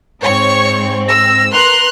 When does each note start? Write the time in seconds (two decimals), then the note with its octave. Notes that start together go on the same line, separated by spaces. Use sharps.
0.22 G#2 C4 C#5 C#6
1.08 E6 A#6
1.53 A#4 B4 A#5 C6 F#6 F7